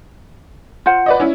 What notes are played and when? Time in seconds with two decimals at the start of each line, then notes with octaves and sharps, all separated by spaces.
0.86 F4 C5 F#5
1.06 B4 D5 D#5
1.20 C#4 E4